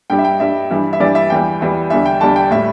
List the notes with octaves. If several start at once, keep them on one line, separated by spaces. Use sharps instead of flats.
G2 G3 G5
E5
G5
G2 G3 E5
G2 E3 G3
E5
G2 E3 G3 D5
E5
E2 E3 G3 G5
E2 E3 G3
E2 D3 G3 E5
G5
E2 D3 G3 A5
G5
A2 G3 E5